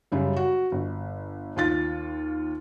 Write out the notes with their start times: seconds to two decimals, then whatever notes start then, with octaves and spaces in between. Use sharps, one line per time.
0.12 F#2 C#3 G3
0.36 F#4
0.72 G1
1.56 D#2 F4 A6